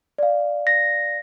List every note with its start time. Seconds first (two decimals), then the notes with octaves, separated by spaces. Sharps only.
0.18 D5 F5
0.67 A#6